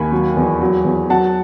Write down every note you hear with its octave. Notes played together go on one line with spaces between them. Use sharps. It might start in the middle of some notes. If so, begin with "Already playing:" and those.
Already playing: D#2 G#5 B5
F#3
E2
F#3
E2
F#3 F#5 A5